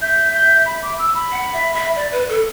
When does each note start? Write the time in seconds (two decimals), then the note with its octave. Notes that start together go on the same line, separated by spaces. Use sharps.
0.01 E5 G6
0.34 G6
0.66 B5
0.83 D6
0.99 E6
1.15 B5
1.32 F#5
1.53 E5
1.74 E5
1.95 D5
2.12 B4
2.29 A4